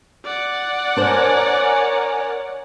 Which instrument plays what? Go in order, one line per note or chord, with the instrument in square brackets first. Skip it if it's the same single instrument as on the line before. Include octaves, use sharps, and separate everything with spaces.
[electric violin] D5 F#5
[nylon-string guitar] D4 C5 [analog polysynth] A#4 G#5 [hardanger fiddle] C#5